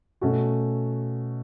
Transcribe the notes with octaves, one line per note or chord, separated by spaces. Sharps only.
B2 A3 C#4 F#4